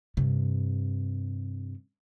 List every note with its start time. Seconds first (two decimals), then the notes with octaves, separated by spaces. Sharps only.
0.17 G2 C3